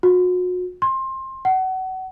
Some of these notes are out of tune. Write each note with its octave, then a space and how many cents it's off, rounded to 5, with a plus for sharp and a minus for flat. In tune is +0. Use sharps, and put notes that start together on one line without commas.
F#4 -35
C6 +20
F#5 +25